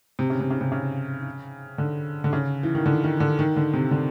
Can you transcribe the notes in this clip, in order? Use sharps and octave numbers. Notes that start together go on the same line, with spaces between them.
C3
C#3
C3
C#3
C3
C#3
D3
D3
C#3
E3
D#3
D3
D#3
D3
D#3
D3
C3
D3